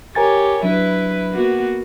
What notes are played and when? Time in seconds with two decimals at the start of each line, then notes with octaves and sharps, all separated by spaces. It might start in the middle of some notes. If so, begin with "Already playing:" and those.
0.15 G4 A#4 C#5 G#5 A6
0.63 F#3 D4 E4 B4
1.30 A#3 B3 F#4